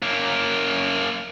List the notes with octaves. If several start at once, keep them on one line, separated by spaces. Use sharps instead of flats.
F#2 A#3